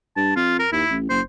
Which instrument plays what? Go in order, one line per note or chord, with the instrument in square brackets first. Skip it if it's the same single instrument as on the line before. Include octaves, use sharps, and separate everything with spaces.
[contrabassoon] G2 [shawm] A5
[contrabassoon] F2 [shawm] F4
[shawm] A#4
[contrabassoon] D#2 [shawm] E4
[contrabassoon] A1
[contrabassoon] F#1 [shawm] C5